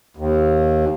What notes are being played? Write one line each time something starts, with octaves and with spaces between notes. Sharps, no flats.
D#2